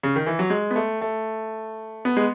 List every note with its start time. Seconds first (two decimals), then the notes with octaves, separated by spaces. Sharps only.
0.03 C#3
0.16 D#3
0.27 E3
0.39 F#3
0.50 G#3
0.71 B3
0.76 A3
1.01 A3
2.05 B3
2.17 G#3